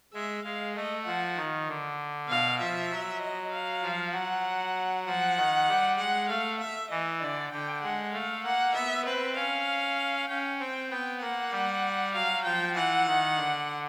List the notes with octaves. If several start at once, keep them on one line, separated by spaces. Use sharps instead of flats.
G#3 E5
G#3 F5
A3 D#5
F3 F#5
D#3
D3
B2 F5
F3 E5
F#3
D#5
F5
F3
F#3 F#5
F3 F#5
D#3
G3
G#3 F#5
A3 F5
E5
E3 D#5
D3 D5
D3 G5
G#3 F#5
A3 F5
A#3 F#5
B3 E5
C4 B4
C#4 F5
C#4 G5
C4 G5
B3 G5
A#3 F#5
G3
F#3 F5
F3 G5
E3 F#5
D#3
D3